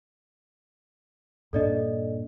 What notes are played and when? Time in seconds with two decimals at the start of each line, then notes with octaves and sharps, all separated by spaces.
1.53 G2 A#2 D4 A4 D5 D#5